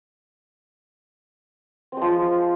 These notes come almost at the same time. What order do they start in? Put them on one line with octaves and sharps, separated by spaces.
C4 G#3 F3